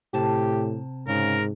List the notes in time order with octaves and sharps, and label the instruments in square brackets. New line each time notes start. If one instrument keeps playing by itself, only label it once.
[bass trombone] A2 [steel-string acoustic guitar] C3 A5 [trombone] G4
[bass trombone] G#2 [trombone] C#3 [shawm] A#4